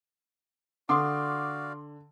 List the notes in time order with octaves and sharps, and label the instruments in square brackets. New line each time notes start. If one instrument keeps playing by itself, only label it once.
[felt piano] D3 [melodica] F#4 D5 F5 [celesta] F#5 D#6 [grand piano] C6 D6